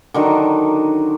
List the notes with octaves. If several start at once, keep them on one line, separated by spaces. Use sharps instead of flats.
D3 D#3 F#3